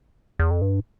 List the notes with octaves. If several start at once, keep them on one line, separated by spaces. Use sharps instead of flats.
E2
F2
G2